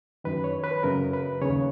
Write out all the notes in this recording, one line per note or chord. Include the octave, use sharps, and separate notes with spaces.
F#2 D#3 B4
C#5
B4
F#2 C#3 A#4
B4
D#2 C#3 C#5